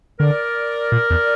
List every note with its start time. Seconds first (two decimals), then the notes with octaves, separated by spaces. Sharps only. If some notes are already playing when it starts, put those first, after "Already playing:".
0.20 D3 A#4 D5
0.92 A#2
1.10 E2